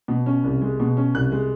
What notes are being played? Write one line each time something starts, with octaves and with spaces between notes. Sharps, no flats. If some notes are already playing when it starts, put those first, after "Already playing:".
B2
C#4
C2
G#3
B2
C#4
C2 F#6
G#3